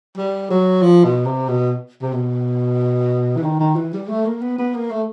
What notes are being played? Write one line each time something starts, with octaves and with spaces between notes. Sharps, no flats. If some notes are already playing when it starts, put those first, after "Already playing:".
G3
F#3
F3
B2
C3
B2
C3
B2
E3
D#3
D#3
E3
G3
A3
A#3
B3
B3
A#3
A3